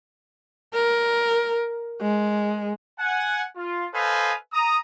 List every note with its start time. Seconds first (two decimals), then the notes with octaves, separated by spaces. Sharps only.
0.74 A#4
2.02 G#3
3.00 F#5 G#5
3.56 F4
3.94 A4 B4 C5 D#5 F5 G#5
4.53 A#5 D#6